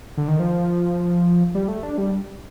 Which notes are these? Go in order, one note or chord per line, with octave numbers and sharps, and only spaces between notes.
D3
D#3
F3
G3
A3
D4
G3